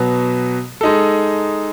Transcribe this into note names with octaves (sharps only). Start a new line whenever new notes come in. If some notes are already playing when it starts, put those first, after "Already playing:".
Already playing: B2 F#3 B3
G#3 D#4 A4